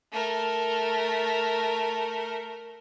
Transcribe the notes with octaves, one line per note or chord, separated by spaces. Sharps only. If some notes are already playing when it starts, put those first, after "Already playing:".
A3 A#4